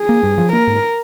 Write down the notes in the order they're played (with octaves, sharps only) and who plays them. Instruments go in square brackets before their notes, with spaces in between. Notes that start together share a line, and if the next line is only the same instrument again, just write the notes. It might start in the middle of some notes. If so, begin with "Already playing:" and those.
Already playing: [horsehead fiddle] G#4
[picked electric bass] A#3
G2
F3
[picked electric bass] A#3 [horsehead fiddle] A#4
[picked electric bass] G#2